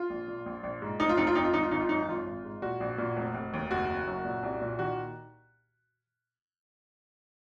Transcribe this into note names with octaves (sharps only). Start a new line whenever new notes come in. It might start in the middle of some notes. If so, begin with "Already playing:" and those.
Already playing: F4
A#1
A#2
A#1
A#1
G#2
F1 D#4
F4
F1 D#4
F4
F2 D#4
F4
G#1 D#4
F4
G#1 D#4
F4
F#2 D#4
G#1 F4
G#1
G#2
A#2 F#4
A#1
A#2
F1
F1
D#2
F#1 F#4
F#1
F#2
A#2
C2
A#2
D#3 F#4